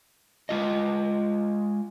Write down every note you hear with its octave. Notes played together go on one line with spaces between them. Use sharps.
G#3 F4 D#5